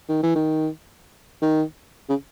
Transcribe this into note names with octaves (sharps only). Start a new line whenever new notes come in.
D#3
E3
D#3
D#3
C#3